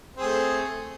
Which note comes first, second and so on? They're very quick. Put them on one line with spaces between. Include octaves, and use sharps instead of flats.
C4 G#4 A3